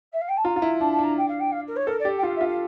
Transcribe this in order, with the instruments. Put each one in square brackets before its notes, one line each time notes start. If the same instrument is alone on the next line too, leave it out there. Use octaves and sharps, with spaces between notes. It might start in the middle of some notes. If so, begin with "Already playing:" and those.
[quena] E5
F5
G5
A5
[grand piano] F4 [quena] A#5
[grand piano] F4
E4
[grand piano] D4 [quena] A5
[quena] A5
[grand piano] D4 [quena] A#5
[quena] G5
F5
G5
F5
A#4
C#5
[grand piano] A4 [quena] A#4
[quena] D5
[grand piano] G4
[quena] G5
[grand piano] F4 [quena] F5
[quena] E5
[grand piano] F4
[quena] F5